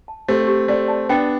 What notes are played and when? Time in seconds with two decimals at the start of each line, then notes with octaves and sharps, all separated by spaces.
0.08 A5
0.28 A3 C4 G4
0.48 G4
0.68 A3 C4 D5
0.88 A5
1.09 B3 D4 G5